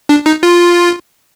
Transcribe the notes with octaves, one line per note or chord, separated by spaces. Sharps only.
D4
D#4
F4